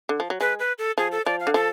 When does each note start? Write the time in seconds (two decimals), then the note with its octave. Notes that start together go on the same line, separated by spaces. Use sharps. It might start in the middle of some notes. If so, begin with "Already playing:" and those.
0.09 D3
0.20 F3
0.30 F#3
0.41 G#3 B4
0.59 B4
0.78 A4
0.98 F3 G#4
1.12 A4
1.26 F3 D5
1.40 F5
1.47 D3
1.54 F3 A4